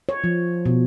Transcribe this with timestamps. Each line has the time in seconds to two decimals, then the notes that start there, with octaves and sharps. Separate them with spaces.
0.09 C#5
0.24 F3
0.66 B2